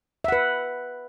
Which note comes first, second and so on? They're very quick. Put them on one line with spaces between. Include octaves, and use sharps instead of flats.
E5 F#5 B4